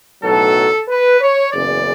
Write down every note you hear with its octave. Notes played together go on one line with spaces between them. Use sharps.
B1 A2 F#3 A4
B4
C#5
F#1 E2 C#3 D5